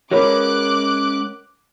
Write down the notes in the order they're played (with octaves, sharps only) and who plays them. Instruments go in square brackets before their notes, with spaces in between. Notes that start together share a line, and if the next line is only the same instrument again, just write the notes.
[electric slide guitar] G#3 C#4 [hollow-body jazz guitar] F#4 A#4 B4 [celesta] C#5 [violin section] D6 F#6